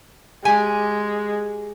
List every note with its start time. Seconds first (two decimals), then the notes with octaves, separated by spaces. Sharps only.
0.45 G#3 G4 G#5